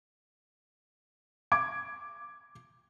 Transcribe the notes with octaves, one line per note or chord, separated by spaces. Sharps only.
D6 G#6 D7